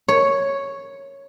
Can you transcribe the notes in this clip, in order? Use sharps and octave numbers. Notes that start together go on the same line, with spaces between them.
C#5